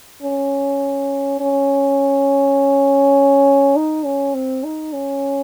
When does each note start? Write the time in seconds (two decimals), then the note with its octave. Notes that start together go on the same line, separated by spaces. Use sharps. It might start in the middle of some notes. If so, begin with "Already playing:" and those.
0.22 C#4
1.40 C#4
3.76 D#4
4.05 C#4
4.35 C4
4.64 D#4
4.93 C#4